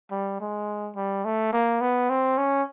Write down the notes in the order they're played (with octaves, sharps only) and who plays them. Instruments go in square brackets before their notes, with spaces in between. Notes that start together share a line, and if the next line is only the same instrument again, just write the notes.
[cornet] G3
G#3
G3
A3
A#3
B3
C4
C#4